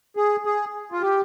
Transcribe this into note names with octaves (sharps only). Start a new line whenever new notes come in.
G#4
G#4
F4
G4